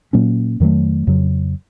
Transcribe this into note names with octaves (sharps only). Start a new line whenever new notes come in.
A#2 F#3 A#3 C#4
F2 D#3 F#3 A3
F2 C#3 F#3